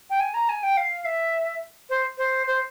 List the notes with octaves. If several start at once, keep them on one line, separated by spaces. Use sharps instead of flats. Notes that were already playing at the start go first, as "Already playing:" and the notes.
G5
G#5
A#5
G#5
G5
F5
E5
C5
C5
C5